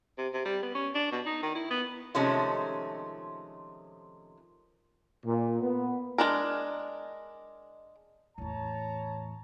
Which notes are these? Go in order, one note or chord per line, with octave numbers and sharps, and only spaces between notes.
C3
C3
G3
B3
C#4
D4
B2
D#4
D#3
E4
B3
C3 D#3 F3 G#3 A3 C#4
A#2
B3
G#3 D4 A#4
E2 A2 C#5 A5 A#5